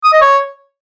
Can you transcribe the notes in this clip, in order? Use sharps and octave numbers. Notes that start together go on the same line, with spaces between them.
D#6
D#5
C#5